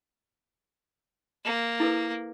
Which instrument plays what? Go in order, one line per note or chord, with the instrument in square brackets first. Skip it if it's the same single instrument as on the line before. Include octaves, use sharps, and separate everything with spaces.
[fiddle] A#3
[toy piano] E4 A4 B4